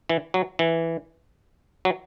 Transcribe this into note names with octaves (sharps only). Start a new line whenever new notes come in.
E3
F#3
E3
F#3